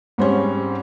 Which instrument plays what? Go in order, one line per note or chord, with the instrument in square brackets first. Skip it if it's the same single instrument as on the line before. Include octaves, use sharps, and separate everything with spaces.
[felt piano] G#2 G3 C4 C#4